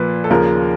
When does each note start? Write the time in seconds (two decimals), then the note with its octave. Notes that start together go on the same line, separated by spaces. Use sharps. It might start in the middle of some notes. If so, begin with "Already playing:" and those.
Already playing: A#2 F3 A#3 B4
0.24 A4
0.30 D#2 C#3 F3 A#4